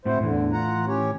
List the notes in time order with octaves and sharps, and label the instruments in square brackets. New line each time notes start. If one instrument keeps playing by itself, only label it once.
[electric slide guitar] A2 C4 F#4 [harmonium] E4 C5
[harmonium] E2 D3 [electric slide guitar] A2 E3
[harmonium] F4 F#5 A#5
C#4 G4 C#5